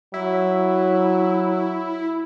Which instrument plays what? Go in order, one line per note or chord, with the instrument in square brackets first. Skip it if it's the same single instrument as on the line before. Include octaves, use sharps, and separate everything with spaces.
[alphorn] F#3 [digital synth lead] E4